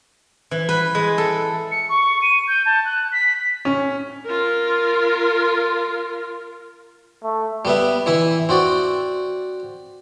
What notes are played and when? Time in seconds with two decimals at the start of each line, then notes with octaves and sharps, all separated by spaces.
0.51 E3
0.69 B4
0.95 G#3
1.18 A4
1.71 C#7
1.89 C#6
2.22 D#7
2.48 G6
2.66 A5
2.85 F#6
3.12 B6
3.65 C#4
4.25 F4 A#4
7.24 A3
7.65 G3 B3 E5
8.06 E3 E4 E5
8.49 C4 F#4 D5